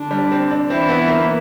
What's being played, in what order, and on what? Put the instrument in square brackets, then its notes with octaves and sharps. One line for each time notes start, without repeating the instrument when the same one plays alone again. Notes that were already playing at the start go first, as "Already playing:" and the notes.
Already playing: [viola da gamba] D3 D4
[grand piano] G3
C4
D4
[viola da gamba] E3 E4 [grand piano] C4
[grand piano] B3
A#3